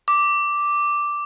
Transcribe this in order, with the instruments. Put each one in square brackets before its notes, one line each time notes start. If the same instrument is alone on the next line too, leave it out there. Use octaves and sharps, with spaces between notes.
[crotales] D6